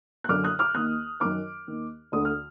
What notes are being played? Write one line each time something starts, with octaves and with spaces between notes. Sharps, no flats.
F#6
F#2 D3 D6 F6
D#6 F#6
D6 F6
D#2 D#3 D#6 F#6
F#2 D#3 D6 F6
D#2 D#3
D2 D3 D#6
F6